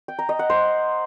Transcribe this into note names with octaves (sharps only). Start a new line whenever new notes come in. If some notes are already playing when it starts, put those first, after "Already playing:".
G5
A#5
D#5
F#5
C5